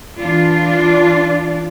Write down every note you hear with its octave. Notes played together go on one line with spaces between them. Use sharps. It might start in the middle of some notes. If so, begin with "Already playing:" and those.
E3 D4 F4